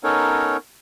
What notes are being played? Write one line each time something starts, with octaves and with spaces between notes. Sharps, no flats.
B3 C#4 D#4 A4 A#4 C#5